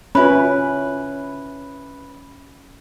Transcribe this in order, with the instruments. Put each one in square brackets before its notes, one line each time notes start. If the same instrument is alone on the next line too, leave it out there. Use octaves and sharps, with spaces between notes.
[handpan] C#4 [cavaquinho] E4 B4 [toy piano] F4 B5